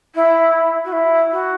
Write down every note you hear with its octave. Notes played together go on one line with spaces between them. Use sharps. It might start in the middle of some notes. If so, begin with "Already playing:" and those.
E4
F#4
E4
F#4